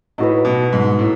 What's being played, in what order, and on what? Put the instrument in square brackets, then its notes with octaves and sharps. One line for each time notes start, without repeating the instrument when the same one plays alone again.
[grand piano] A2 [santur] D#4 F#4 B4
[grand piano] B2
G#2
A2